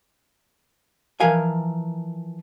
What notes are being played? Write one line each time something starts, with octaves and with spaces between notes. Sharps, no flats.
E3 F3 A#4 F5 G#5